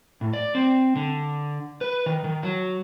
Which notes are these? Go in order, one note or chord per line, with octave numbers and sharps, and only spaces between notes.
A2
D5
C4
D3
B4
D#3
D#3
F#3